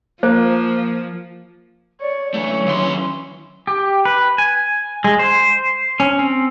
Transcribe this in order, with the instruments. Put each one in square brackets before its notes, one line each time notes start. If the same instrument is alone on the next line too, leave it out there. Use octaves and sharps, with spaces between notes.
[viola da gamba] F3 [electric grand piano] A#3 [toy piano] C5
[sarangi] C#5 [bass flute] D5
[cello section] D3 F#3 C#4 [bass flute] E3 [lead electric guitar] A3 [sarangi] C#5
[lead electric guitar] D#2 C6
[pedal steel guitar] G4
B4
G#5
G#3
C5
C#4
C4